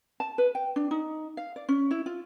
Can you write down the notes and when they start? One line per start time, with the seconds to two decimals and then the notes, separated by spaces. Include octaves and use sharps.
0.20 A5
0.38 B4
0.55 G5
0.76 D4
0.91 D#4
1.37 F5
1.56 D5
1.69 C#4
1.91 E4
2.06 F4